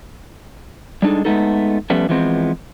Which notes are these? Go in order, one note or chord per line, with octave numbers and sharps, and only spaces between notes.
G3 G#3 D4 D#4 A4
G#3 A3 B3 D#4 A4
F3 G3 A3 B3 C#4
E3 F3 G#3 B3 C4